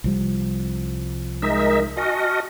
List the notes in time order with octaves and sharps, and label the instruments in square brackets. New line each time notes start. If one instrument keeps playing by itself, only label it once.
[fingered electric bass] C2 F3 G3
[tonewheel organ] G#3 D#4 E5 [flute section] A#4
[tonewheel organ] F#4 D#5 [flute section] G#5 A5 F6